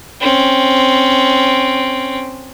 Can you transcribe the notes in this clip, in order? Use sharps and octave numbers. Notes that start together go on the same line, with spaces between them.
C4 C#4